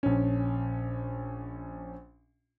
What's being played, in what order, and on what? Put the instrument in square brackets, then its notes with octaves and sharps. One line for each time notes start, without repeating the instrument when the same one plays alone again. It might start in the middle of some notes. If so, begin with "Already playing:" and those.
[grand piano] A#1 C#4